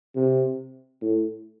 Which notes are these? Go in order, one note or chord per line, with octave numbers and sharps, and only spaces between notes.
C3
A2